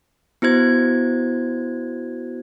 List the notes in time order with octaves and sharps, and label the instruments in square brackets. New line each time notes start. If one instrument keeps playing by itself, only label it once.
[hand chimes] B3 E4 F#4 C5 G#6